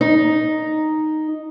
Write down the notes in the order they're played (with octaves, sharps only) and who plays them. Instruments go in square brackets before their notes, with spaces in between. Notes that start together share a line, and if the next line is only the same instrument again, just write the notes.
[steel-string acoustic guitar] D#4